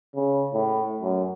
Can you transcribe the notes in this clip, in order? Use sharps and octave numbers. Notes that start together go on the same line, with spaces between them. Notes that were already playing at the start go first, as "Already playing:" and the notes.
C#3
A2
F#2